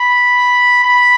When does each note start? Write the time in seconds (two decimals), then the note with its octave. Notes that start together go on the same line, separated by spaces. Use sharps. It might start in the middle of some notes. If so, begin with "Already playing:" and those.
Already playing: B5
0.84 B5